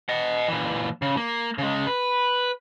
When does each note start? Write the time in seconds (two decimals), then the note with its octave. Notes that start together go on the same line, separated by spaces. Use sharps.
0.09 D#5 F#5
0.48 A#2 E3
1.02 C#3
1.17 A#3
1.58 C#3 G#3
1.87 B4